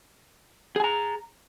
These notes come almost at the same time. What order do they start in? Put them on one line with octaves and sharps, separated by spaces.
G#4 G#5 A#5